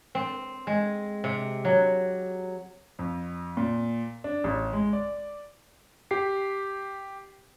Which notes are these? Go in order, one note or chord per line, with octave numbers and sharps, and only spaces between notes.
C4
G#3
C3
F#3
F2
A#2
D4
A1
G#3
D5
G4 C7